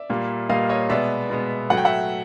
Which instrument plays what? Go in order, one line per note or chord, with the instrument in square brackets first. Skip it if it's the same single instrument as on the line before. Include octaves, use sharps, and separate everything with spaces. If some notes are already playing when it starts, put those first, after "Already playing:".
Already playing: [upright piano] D5 E5
A#2 G3 A#3
A#2 G3 A#3 D#5 F5
C#5 D#5
B2 G#3 B3 D5 E5
B2 G#3 B3
A2 F#3 A3 F#5
G5
E5 F#5